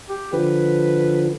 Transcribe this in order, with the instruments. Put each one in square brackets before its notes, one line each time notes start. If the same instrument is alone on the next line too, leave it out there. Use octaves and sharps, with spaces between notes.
[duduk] G4
[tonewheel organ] D3 F3 [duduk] B4